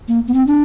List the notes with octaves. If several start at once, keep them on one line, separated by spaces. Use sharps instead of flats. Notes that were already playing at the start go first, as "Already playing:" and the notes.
A#3
B3
C4
D4